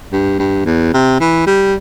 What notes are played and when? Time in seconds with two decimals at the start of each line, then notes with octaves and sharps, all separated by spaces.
0.12 G2
0.39 G2
0.65 E2
0.94 C3
1.20 E3
1.46 G3